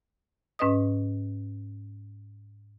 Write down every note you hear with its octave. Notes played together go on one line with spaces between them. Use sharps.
G#2 C#4 B4 D#5 D#6